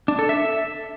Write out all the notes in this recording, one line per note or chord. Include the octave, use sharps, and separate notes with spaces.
D4
A4
E5